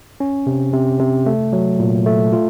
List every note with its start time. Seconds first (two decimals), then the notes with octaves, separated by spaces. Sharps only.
0.20 C#4
0.47 C3
0.73 C3
1.00 C3
1.26 A3
1.53 F#3
1.80 A#2
2.06 A3
2.33 F4